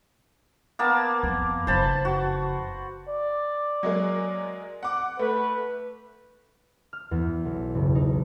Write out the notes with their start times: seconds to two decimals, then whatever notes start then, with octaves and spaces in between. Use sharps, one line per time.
0.79 A#3 B3 A5
1.23 F2
1.67 F#1 F2 C5 A5 B5
2.05 F#4
3.08 D5
3.83 F#3 G#3 A#3
4.83 F#5 D6
5.19 A3 B4
6.93 F6
7.11 E2
7.45 B1
7.75 F#1
7.95 D#4